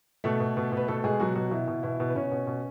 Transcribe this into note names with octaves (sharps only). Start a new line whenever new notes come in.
B2 A3 A4
B2
B2
B2
B4
B2 A3 A4
B2 G#3 G#4
B2 F#3 F#4
B2 F#3 F#4
B2 E3 E4
B2
B2 E3 E4
B2
B4
B2 C#4 C#5
B2
B2